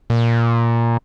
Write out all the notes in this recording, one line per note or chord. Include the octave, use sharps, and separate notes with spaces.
A#2